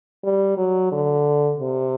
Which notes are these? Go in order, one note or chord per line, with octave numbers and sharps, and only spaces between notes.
G3
F#3
D3
C3